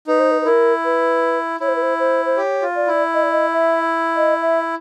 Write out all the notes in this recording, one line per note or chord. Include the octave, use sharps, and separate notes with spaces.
D#4 B4
C5
B4
B4
E4 A#4
B4
E4 C#5
C5
B4
C5
C5
C5
G4 C#5
F4
D5
E4
D#5
D5
D#5
E5
D#5
E5